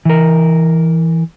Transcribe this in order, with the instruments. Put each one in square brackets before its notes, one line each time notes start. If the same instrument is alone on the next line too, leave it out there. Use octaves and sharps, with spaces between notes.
[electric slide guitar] E3 A#4